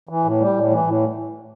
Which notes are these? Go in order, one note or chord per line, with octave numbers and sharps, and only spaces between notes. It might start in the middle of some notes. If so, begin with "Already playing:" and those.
E3
A2
G3
A2
E3
A2